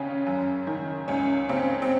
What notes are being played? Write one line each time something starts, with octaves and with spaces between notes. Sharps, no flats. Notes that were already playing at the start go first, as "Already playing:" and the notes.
Already playing: D#2 C#3 C#4
F#2
D#3
C#2 C#4
C#3 C4
C4